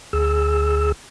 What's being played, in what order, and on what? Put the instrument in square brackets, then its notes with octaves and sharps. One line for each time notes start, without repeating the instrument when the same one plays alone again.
[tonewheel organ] D2 G#4 E6